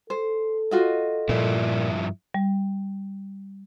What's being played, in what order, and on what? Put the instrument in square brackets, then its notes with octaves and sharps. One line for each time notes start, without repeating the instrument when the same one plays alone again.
[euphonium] A4 [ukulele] C5
[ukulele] F4 F#4 D#5
[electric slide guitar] G2 F3 E4 [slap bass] A#2
[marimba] G3